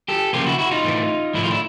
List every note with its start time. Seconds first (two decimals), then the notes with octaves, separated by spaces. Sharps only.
0.08 G4 A4
0.33 C#3 F3 A#3 F4 G4
0.46 E4 F#4
0.58 E4 F#4
0.71 D#4 F4
0.84 A2 E3 A3
1.34 A2 F3 A3 E4
1.43 F4
1.51 D4 E4